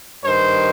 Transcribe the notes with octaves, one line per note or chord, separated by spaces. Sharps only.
G2 D#3 C5